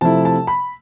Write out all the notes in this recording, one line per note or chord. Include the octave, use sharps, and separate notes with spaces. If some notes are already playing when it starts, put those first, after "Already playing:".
C3 F3 A3 E4 A5
A5
B5